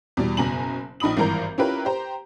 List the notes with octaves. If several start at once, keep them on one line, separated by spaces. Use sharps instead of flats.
E2 B2 G3
F#1 B2 G#5 A#5 F#7
A#1 D#4 B5 D#6 F#7
G#1 G2 E3 A#4 A#5 G6
C#4 E4 F4 G4 A#4 B4
G4 C5 A#5